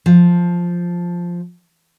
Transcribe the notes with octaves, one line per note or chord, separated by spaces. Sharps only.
F3